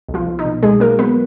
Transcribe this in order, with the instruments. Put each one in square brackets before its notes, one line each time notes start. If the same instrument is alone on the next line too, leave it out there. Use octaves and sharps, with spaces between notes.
[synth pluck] B1
F3 F4
B1
D#4
B2
B1 G#3 G#4
F#3 A#3 A#4
F#3 B3 B4